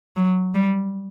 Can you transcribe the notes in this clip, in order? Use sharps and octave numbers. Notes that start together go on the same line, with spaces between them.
F#3
G3